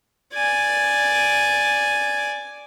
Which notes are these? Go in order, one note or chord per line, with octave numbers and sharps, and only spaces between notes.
D5 G#5